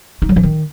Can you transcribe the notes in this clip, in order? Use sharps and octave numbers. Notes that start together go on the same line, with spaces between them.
D#4
F#3
E3
D#3